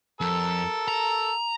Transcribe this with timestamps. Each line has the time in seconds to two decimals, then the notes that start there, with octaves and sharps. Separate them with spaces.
0.21 F2 A4 A#4 E6
0.88 A#5